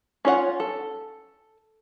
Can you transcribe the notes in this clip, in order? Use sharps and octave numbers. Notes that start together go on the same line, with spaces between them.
C#4 F4 C#5 D5 F#5
A4